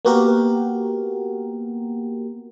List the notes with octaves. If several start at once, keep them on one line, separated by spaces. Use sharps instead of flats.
A#3 B3 F#4 G4 A#4